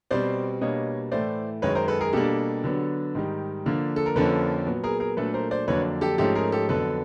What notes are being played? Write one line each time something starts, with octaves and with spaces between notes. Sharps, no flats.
B2 G3 C4 C5 D5
B2 G3 A#3 D4 C#5 D#5
A2 E3 A3 C5 D5
F#2 D#3 G#3 B4 C#5
A#4 C5
A4 B4
G#4 A#4
B2 G3 A#3 D4 G4 A4
D3 F#3 B3 D4
G#2 D#3 G3
D3 F3 A#3 D4
A4
A#4
F2 D3 F3 A#3 C#4 A4 B4
A#2 F#3 B3
G#4 A#4
G#4 A#4
A#2 F#3 A3 D4 A4 B4
A#4 C5
C5 D5
F2 D3 F#3 A#3 D4 B4 C#5
G4 A4
G#2 F3 A3 C#4 G4 A4
G#4 A#4
G4 A4
F2 D3 F#3 B3 A4 B4